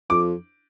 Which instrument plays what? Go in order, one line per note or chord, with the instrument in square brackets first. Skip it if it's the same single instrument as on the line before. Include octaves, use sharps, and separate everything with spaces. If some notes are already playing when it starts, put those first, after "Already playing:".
[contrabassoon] F2 [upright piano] D6